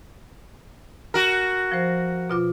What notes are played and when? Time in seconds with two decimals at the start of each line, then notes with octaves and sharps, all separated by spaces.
1.14 F#4 A#4
1.72 F3 C5
2.30 B2 F4 D6